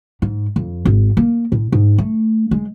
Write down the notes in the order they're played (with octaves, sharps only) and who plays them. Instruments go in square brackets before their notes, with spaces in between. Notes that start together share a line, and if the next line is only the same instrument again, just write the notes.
[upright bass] G#2
F2
G#1
A#3
A2
G#2
A3
G#3